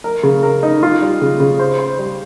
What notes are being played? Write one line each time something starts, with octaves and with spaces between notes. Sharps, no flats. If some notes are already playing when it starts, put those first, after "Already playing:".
A#4
C#3
A#4
D#4
F4
G3
C#3
C#3
C5
C5
G3